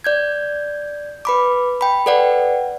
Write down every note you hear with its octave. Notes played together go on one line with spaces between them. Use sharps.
D5 G6 G#6
B4 B5 D6
G5 B5
A4 B4 D5 F#5 G5